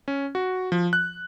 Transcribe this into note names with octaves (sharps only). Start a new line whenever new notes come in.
C#4
F#4
F3
F#6